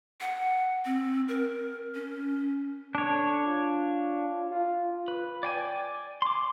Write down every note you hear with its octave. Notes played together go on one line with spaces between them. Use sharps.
F#5
C4
A#4
C#4
D3 D4 C#5
F4
F4
B4
D5 G5 G#5
C6 D6